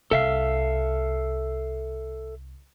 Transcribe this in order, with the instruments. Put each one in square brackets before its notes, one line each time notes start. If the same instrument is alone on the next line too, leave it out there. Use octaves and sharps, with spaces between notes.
[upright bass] C2 [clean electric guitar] A4 E5 F5